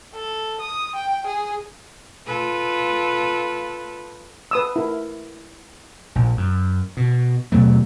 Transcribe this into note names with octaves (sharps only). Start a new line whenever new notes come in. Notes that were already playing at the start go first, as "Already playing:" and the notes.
A4
D#6
G5
G#4
F4 A4 B4
B4 D#6 E6
E4 A#4
A#1
F#2
B2
D#2 B2 F#3 A3